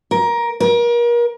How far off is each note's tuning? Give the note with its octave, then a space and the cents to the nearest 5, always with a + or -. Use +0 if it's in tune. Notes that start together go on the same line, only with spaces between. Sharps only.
A#4 +15
A#4 +35